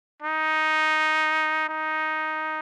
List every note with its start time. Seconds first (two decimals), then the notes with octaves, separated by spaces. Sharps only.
0.22 D#4
1.69 D#4